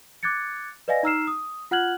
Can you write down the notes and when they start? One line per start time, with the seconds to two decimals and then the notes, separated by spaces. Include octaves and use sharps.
0.23 D6 F#6 G#6 A6 C#7
0.88 B4 D5 D#5 F5 G#5 A#6
1.03 D#4 A#5 E6 F6 C7 E7
1.27 D#6
1.71 F4 F#5 F6 F#6 G#6 F#7